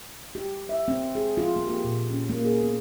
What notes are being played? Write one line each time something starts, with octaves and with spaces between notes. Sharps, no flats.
G4
E5
C4
G#4
F4
A#3
G4
A#2
C#4
A#3
G#4
B3